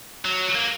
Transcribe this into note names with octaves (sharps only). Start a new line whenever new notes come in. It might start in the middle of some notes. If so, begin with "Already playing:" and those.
F#3
A#3